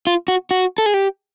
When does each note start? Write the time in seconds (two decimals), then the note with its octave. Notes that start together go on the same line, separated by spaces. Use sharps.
0.07 F4
0.28 F#4
0.51 F#4
0.78 A4
0.86 G#4
0.94 G4